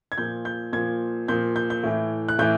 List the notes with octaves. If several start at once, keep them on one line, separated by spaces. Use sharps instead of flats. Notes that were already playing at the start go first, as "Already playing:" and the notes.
G#6
A#2 F3 G6
G6
A#2 F3 G#6
A#2 F3 G6
G6
G6
A2 E3
F#6
A2 E3 G6